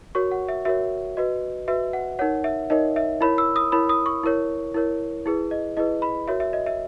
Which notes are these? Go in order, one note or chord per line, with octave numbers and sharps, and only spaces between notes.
F#4 A#4 C#5 C#6
F#5
E5
F#4 A#4 C#5 E5
F#4 B4 D#5
F#4 B4 E5
F#5
D#4 A#4 C#5 F#5
E5
D#4 A#4 C#5 D#5
E5
E4 A#4 C#5 B5
E6
D#6
E4 A#4 C#5 B5
D#6
C#6
E4 A#4 C#5
E4 A#4 C#5
E4 G#4 B4
D#5
E4 G#4 B4 D#5
B5
F#4 A#4 C#5 E5
E5
D#5
E5